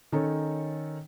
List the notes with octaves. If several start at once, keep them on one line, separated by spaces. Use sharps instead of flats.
D#3 C#4 D#4 A4 C#5